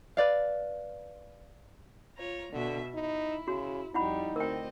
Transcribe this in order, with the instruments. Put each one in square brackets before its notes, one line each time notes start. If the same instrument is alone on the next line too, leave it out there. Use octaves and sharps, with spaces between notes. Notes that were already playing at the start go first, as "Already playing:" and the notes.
[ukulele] B4 D5 F5
[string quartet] F4 C#5 A#5
[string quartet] B2 E5 [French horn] D3
[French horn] D#4 [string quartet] E4
[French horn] C#3 [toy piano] F#4
[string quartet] F2 G3 [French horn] D#4 [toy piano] E4 F#5 B5
[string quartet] D2 C4 D#5 [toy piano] A#4 G5